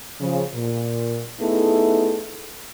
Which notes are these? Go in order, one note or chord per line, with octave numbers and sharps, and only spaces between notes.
C#3 F3
A#2
A3 B3 D#4 E4 G#4 A4